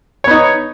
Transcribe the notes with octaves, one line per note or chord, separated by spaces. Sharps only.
B3 D#4 C#5